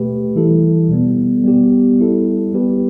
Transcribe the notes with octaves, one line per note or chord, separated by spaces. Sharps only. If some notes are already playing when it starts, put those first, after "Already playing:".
Already playing: B2 A3 G4 B4
E3 G3 E4 A4
B2 G3 B3
G3 B3 G4
G3 E4 A4
G3 B3 G4 B4